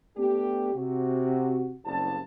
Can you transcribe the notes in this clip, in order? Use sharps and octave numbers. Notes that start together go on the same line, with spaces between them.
A3 B3 D4 G4
C3 F#4
F#1 C2 A5